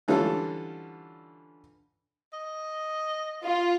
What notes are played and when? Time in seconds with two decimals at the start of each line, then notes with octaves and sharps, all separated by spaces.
0.08 D3 E3 G3 C#4 F4 A4
2.33 D#5
3.44 F4